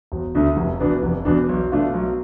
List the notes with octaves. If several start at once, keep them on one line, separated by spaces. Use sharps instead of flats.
E1
D2 D3 A3
F1
E2 B2 B3 D4
F1
E2 B2 B3 D4
B1
B2 A3 D4 F4
B1